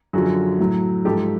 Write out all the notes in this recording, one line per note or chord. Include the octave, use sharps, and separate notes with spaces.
F#2 D3 F3 F#4 G#4
A2 F#3
G#2 F3 G4 A4